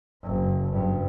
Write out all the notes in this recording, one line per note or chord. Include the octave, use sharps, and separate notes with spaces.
F#1
F#1 G2